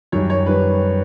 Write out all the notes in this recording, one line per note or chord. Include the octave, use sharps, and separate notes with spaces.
F#2 D#3 G3 C#5
C#5
D#3 G3 B4